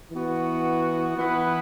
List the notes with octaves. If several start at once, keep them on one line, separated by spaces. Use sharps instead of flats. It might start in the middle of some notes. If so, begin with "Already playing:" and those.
E3 B3 F#4
E3 B3 E4 B4